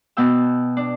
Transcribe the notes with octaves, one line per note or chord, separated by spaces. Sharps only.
B2 B3 G5 E6
D4